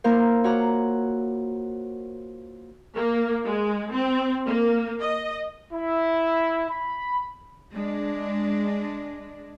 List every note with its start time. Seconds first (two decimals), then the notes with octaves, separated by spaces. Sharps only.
0.04 A#3 E4 A#4 C5 F5
0.44 F4 F#4 C#5 F#5 A#5 D6
2.94 A#3
3.45 G#3
3.91 C4
4.45 A#3
4.99 D#5
5.73 E4
6.70 B5
7.74 G#3 D4